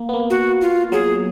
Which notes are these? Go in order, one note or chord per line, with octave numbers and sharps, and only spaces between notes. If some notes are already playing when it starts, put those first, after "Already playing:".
Already playing: A#3
B3
A#3
F#4
F4
F#3 G#4